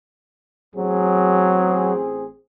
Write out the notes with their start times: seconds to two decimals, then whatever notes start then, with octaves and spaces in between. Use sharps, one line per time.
0.75 A1 F#3 C4 G#4